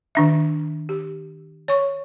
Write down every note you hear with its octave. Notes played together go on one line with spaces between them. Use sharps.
D#3 D4 E5
G4
C#5 C#6